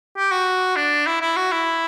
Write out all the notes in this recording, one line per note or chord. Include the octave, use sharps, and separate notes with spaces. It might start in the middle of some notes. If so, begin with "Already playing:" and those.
G4
F#4
D4
E4
E4
F#4
E4